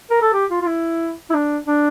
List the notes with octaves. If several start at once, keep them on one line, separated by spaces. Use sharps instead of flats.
A#4
A4
G4
F4
F4
E4
E4
D4
D4